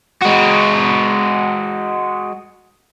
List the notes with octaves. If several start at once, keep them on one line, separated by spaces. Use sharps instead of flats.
G#3 F#4